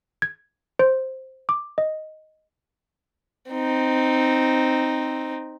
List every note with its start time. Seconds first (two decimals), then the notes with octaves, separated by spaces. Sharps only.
0.22 G#6
0.79 C5
1.49 D6
1.78 D#5
3.52 C4 D#4